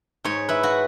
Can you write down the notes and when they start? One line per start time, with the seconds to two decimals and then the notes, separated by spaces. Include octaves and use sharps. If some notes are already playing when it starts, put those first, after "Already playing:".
0.24 G#2 C#5
0.49 E4 B4
0.63 F#4